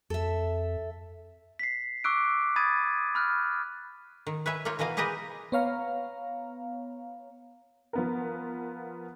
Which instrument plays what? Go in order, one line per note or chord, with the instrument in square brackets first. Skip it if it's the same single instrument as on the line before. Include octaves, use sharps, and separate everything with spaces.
[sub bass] F2 [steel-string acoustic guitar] A4 E5
[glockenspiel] B6 C7
C#6 D6 E6 F#6 D7
B5 D#6 G#6 A6 D#7
B5 F6 F#6
[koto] D#3
B4 C#5 E5 G#5
A#3 D#4 F4 C#5
B2 E3 A#3 D#5 F5
G4 G#4 A#4 B4 D#5
[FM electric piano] B3 C#5 F5 A#5
[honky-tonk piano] F3 B3 A#4